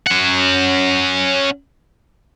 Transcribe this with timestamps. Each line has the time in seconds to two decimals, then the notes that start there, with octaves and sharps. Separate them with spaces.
0.07 C#4 F#5